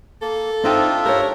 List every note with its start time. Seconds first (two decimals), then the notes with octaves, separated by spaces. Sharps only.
0.22 A#3 A4
0.64 C4 D4 D#4 F4 E5 G5
1.05 G4 A#4 C#5